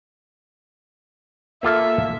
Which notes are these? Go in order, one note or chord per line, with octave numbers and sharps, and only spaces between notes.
A#3 F4 A4 E5